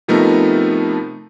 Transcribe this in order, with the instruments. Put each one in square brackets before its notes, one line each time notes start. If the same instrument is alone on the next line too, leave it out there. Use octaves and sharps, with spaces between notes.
[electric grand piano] C3 F3 A3 B3 D#4 A#4